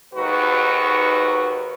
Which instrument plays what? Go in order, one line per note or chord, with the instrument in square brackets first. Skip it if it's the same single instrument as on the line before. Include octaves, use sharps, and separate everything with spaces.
[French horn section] D#2 G#2 F#4 B4